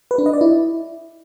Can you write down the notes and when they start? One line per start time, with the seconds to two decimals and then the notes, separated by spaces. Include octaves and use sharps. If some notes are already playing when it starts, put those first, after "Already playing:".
0.11 B4
0.18 D4
0.26 D#5
0.33 D5
0.41 E4